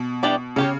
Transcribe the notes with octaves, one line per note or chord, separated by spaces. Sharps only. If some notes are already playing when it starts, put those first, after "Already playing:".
Already playing: B2
E3 G3 D4 G4 D5
C#3 C#4 G4 C#5